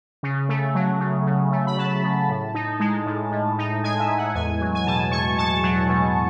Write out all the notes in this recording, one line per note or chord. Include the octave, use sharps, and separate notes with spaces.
C#3
A3
F#3
C#3
C#3
A3
B5
F#3 A5
C#3
A2
D#4
G#3
A2
A2
D#4
G#3 G#5
E5
A2
F#5
E2 G#5
F#3
G#5
B2 A5
E2 C#6
E2 A5
F#3
B2